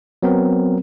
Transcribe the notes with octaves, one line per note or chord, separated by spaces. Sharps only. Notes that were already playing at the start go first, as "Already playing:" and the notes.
F#3 B3 C4 A#4